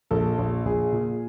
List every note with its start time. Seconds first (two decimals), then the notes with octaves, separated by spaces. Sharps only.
0.11 A#1 A4
0.38 A#1
0.65 A#1 G#4
0.92 A#2